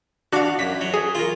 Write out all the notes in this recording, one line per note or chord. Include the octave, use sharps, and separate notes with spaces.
D4 F#4 F5 F#5
F#2 B6
F#3
G#4
F4 A#4